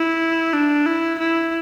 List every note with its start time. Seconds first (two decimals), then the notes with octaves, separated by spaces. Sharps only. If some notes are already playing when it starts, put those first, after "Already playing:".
Already playing: E4
0.53 D4
0.86 E4
1.19 E4